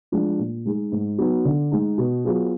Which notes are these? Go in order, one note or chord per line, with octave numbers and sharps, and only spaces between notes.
F3 G#3 D4
A#2
G#3 D#4 G#4
G#2
F#3 B3 D#4 F#4
D3
G#3 D#4
B2
F#3 B3 F4 G#4